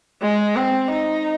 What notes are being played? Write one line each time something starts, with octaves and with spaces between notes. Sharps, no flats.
G#3
C4
D#4